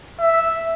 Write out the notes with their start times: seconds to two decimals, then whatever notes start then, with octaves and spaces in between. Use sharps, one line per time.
0.20 E5